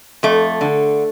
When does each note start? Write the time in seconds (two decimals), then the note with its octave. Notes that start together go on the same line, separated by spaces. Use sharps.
0.23 F2 A3
0.61 D3